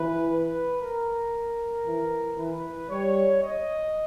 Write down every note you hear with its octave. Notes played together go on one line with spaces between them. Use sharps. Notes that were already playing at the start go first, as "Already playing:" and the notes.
Already playing: E3 B4
B4
A#4
E3
E3 B4
G3 C#5
D#5